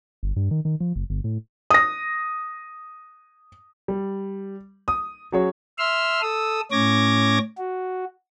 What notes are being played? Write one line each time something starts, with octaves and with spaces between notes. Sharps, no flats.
G1
G2
D#3
D#3
F3
F#1
G1
A2
D#6 A#6
G3
D#6
F#3 C#4 F#4 G#4 C#5
E5 C6 E6 F6
A4 D#6 E6
A2 C#4 C#5 D6 G#6 A#6
F#4